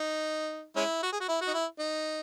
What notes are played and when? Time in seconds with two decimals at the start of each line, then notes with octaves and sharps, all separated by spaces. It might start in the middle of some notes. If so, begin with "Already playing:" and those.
Already playing: D#4
0.76 G#3 C#4 E4
1.03 F#4
1.12 G#4
1.20 F#4
1.28 E4
1.41 F#4
1.48 D#4
1.54 E4
1.79 D#4